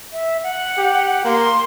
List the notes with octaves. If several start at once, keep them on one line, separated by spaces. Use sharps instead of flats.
E5
F#5
G4
A#3 C6